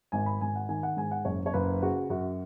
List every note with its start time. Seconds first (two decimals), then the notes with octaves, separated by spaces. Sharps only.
0.12 G#1 G#5
0.26 B5
0.41 G#1 G#5
0.56 F#5
0.69 D#3 G#5
0.83 F#5
0.97 G#2 G#5
1.11 F#5
1.25 F#1 C#5
1.46 C#5
1.53 F#1 B4
1.81 C#3 F#4
2.10 F#2 F#4